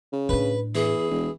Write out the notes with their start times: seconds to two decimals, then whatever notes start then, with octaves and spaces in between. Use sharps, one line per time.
0.13 C#3
0.29 A2 D4 B4
0.75 E2 E3 G#4
1.11 E1